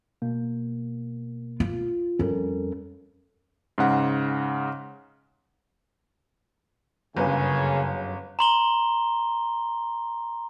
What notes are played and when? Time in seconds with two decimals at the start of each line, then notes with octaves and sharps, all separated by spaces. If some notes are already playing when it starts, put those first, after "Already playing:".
0.22 B2 A#3
1.60 F4
2.19 F2 G3 C#4 A4 A#4
3.78 G#2 C#3 F#5
7.16 G1 F#2 C#3 A#3 B4 G#5
8.39 A#5 C6 G7